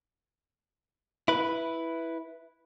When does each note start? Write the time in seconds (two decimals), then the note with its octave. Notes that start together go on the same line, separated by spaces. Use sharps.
1.28 E4 B4